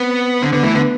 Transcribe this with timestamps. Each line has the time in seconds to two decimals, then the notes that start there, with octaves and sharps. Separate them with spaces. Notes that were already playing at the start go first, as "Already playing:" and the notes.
Already playing: B3 C4
0.41 D3 C4
0.53 D3 B3
0.63 E3 A3
0.74 D3 B3